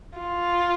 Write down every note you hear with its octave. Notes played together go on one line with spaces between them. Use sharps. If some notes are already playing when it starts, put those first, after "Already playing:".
F4